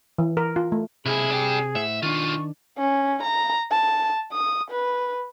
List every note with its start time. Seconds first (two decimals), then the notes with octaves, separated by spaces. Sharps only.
0.18 E3
0.37 A#4
0.56 F4
0.72 A3
1.06 B1 C3 E4 G#4 B5
1.30 D4 G4
1.75 A2 C5 E5 F#5
2.02 B1 D#3 D4 F4 C#6
2.78 C#4
3.23 A#5
3.71 A5
4.33 D#6
4.71 B4